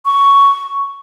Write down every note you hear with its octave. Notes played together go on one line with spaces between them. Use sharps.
C#6